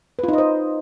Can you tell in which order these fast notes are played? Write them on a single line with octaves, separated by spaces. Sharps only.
B4 F4 D#4 D#5 C5